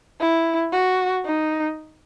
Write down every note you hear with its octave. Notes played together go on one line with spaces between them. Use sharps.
E4
F#4
D#4